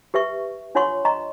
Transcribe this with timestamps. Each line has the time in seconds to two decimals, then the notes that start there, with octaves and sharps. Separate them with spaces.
0.14 G4 B4 E5 C#6
0.75 D4 F4 C#5 F#5 C6 C#6
1.05 D#5 A#5 C6 C#6